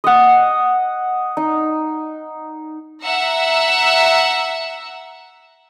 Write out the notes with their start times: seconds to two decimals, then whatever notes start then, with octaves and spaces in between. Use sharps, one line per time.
0.04 D#5 F#5
1.37 D#4
3.04 E5 F#5 A#5 E6